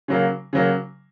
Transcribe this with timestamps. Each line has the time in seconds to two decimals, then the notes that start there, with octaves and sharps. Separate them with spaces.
0.08 C#3 F#3 A#3
0.53 C#3 F#3 A#3